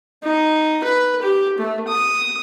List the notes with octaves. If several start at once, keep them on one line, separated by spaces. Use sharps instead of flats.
D#4
B4
G4
A3
D#6